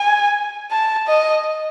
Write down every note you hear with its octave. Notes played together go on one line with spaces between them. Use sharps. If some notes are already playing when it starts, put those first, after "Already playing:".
Already playing: G#5
A5
D#5